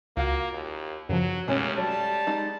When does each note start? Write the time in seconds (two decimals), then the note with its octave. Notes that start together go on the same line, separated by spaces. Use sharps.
0.17 C#2 A#3 F4 F#4 F5 F#5
0.53 D#2
1.09 F#2 C#3 F3 F#3
1.48 D#2 B2 G#3 A3 C#4
1.78 F#3 G3 A5
2.27 G#3 D#4